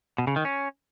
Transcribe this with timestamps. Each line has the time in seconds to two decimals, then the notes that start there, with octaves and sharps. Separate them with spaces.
0.18 B2
0.27 C#3
0.36 D#3
0.45 C#4